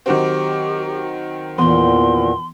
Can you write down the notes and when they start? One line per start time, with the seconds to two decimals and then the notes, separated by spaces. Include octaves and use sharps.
0.06 D#3 F#3 C4 G4
1.58 E2 A#2 E3 B3 C6